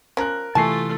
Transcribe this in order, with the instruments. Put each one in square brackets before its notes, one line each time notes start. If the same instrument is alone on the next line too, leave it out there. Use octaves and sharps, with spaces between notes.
[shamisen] F3 C#4 [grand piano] A#4 F#6
[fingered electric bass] C3 E3 [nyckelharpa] A3 F4 [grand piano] G#5 C#6 C7 [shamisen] A5